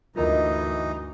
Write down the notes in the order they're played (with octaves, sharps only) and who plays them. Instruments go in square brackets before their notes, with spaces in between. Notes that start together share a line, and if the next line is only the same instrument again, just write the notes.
[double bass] D2 G2 [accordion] E3 D#4 [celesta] F4 A#4 D#5